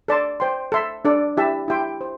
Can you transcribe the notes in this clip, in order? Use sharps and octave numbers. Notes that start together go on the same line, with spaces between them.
A4 D5 A5 C6
C5 G5 C6
A4 E5 C6
D4 A4 D5
E4 G4 E5 A5
E4 G4 E5 G5 C6
C5